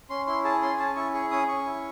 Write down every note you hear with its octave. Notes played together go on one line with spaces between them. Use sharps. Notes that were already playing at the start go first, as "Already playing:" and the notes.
C#4 C6
E4 C6
G#4 A5
C#4 C6
G#5
C#4 A5
E4 C#6
G#4 C#6
C#4 D#6
C#4 C#6
E4